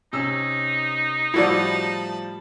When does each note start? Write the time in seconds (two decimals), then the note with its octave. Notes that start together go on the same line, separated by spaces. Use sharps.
0.13 C3 C#4 D#4 E6
1.34 A2 F3 G3 E4 F#4 D5 A5 B5